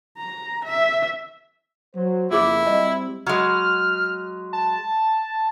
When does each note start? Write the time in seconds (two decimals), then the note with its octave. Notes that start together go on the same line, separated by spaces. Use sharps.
0.18 A#5
0.65 E5
1.95 F#3 C5
2.31 F2 C#3 A#3 E4 F4 G#4 D6
2.66 G3 C4 D#5
3.26 F#3 G#3 F6
4.53 A5